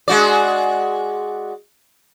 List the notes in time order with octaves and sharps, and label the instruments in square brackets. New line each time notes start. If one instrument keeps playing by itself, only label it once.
[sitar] G#3 F#4 D5